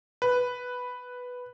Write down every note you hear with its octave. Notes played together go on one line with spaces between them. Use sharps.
B4